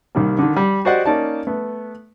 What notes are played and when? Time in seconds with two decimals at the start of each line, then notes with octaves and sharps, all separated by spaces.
0.15 C2 D#3 G3 A#3
0.38 D3 D#3
0.56 G3
0.85 F#4 G4 C5 D5 D#5 F#5
1.06 A#3 C#4 D#4 D5 A5
1.47 A3 B3